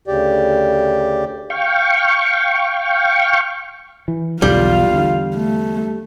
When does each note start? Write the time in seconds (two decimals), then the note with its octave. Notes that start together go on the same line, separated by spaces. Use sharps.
0.08 D2 C#3 G4 D5
1.50 F5 G5 C#6
4.08 E3
4.42 B1 E2 D3 G3 F4 F5
4.90 E2 D3
5.35 A3